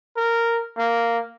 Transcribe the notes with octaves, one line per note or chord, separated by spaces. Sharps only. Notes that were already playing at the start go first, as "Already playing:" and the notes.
A#4
A#3